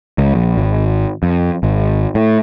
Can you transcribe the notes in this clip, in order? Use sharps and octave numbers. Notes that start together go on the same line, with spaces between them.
C#2
A#1
G#1
F2
G#1
A2